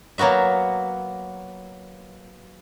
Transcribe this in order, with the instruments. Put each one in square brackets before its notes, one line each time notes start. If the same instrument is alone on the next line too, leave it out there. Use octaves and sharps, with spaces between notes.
[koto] F#3 A#3 B3 F#4 E5